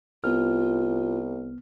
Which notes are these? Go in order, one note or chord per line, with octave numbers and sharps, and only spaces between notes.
C2 B3 F4 F6